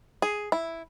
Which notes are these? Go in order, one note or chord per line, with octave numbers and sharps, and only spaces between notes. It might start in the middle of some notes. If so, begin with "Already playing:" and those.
G#4
E4